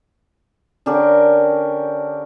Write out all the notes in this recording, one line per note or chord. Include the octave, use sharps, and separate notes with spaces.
D3 C#4 G4 A#4